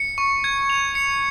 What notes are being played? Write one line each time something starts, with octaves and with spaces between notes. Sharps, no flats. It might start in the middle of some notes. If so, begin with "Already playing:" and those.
Already playing: C#7
C#6
G#6
F7
C#7